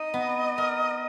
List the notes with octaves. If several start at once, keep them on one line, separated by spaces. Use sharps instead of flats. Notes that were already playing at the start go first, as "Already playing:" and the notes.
Already playing: D#4 D#5
B3
A#4